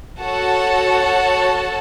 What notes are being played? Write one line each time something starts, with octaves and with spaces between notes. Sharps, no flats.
F#4 A4 C#5 F#5 A5